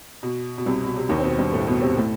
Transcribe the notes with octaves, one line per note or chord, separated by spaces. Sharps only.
B2
B2
C2 C3
B2
C3
D#2 D#3
C4
B2 B3
G2 G3
A2 A3
B2 B3
C3 C4
A2 A3